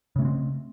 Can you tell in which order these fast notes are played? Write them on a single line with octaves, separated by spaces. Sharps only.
C#3 A3 C#4 C4